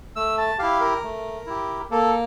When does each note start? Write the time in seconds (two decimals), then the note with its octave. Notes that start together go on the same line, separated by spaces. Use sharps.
0.16 A3 E6
0.38 A5
0.58 E4 G4 F5
0.80 A#4
1.03 A3
1.47 E4 G4
1.91 A#3 A4